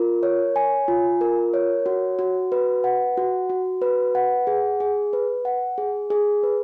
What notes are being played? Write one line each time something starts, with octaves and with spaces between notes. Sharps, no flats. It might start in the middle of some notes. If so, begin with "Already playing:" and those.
Already playing: F4 A#4
C#5
G#5
F4
A#4
C#5
F#4
F#4
B4
F#5
F#4
F#4
B4
F#5
G#4
G#4
B4
F#5
G#4
G#4
B4